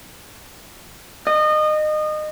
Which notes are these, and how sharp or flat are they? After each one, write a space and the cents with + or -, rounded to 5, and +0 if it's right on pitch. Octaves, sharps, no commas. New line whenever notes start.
D#5 -25